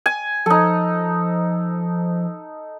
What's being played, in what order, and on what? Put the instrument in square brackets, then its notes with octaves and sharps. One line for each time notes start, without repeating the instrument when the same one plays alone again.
[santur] G#5
[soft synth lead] F3 [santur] D#4 A4